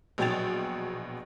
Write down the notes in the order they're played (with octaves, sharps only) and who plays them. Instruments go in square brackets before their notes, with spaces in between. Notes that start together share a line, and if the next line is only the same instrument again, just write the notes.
[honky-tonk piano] A#1 B2 F#3 G5 A6 F7